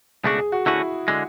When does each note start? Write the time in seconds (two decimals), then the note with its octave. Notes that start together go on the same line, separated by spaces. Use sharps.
0.24 C#2 B2 A3 D4 F#4 G#4
0.38 G#4
0.52 F#4
0.66 D3 A3 C#4 E4 F#4
1.08 D3 G#3